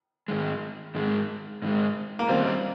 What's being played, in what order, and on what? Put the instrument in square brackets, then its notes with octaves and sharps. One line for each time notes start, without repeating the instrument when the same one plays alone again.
[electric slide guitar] G#2 D#3 G#3
G#2 D#3 G#3
G#2 D#3 G#3
[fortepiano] A#3
[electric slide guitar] D#3 G3 C#4 [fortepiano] C4